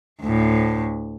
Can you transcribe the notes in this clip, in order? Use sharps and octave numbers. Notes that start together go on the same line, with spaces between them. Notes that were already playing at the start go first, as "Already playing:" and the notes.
D2 A2